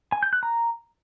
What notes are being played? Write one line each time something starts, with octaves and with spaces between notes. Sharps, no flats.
G#5
G6
F#6
A#5